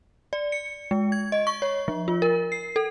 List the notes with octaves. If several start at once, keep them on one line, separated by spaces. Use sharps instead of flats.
D5
C#7
G#3
G#6
D#5
C#6
C#5
F3
F4
A#4
C7
A4